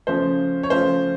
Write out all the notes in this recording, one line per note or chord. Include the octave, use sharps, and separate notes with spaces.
C#3 F3 A3 C#4 F4 C5
C#5
C#3 F3 A3 C#4 F4 C5